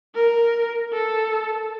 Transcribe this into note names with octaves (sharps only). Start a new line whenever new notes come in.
A#4
A4